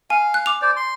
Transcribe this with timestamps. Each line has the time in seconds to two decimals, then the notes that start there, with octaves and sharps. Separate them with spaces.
0.10 F5 G#5
0.34 F#6
0.46 D6 F7
0.62 C5 D5
0.76 C6